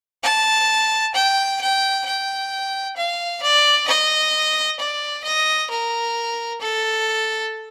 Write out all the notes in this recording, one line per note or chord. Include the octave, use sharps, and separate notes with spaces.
A5
G5
G5
G5
F5
D5
D#5
D5
D#5
A#4
A4